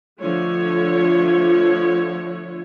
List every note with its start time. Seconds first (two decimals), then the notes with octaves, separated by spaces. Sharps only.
0.20 D3 F3 A3 F4 C#5